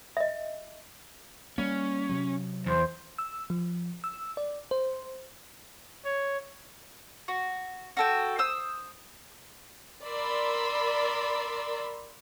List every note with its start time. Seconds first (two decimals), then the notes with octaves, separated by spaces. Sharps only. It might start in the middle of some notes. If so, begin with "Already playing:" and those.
0.17 D#5 E5
1.58 G3 A#3 C#4
2.09 C3 F#3
2.66 E2 C5
3.18 E6
3.50 F3
4.04 E6
4.37 D5
4.71 C5
6.05 C#5
7.28 F#4
7.97 F#4 A4 G5
8.39 C5 D#6 E6
10.04 A#4 D5 B5 C6 E6